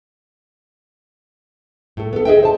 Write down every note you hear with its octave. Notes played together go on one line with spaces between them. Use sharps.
A2 A4
B3 A4
G#4 D#5 E5 G5
C5 A5